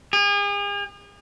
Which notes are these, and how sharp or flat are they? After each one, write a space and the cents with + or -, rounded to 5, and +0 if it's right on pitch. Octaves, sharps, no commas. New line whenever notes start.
G#4 -40